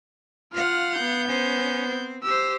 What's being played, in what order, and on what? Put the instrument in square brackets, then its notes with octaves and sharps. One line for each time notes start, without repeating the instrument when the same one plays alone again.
[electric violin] F4 F6 [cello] F5 F#5
[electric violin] B3 G6
[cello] C#4 C5
C4
[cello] G4 C5 [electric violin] E6